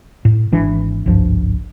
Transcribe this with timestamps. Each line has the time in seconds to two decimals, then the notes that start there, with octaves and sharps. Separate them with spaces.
0.25 A2
0.52 G#1 E3 D4
1.06 G#1 C#2 G2 F3